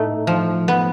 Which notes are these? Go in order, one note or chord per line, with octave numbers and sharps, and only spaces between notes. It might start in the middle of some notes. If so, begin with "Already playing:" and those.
Already playing: A2 A3 D#4
F3
B3